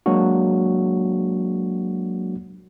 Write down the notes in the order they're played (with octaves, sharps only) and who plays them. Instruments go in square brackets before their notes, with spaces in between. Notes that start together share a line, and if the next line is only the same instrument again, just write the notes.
[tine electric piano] F#3 G#3 A#3 D4 F#4